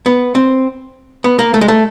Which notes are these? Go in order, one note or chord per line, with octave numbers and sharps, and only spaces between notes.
B3
C4
B3
A#3
A3
G#3
A3